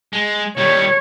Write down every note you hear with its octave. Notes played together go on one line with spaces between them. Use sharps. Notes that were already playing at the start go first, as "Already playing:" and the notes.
G#3
D#3 G3 C#5